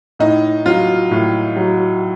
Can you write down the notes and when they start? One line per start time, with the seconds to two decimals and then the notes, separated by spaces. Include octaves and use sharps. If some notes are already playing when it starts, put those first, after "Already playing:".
0.19 A2 D#4
0.66 F#3 F4
1.11 A2
1.56 F#3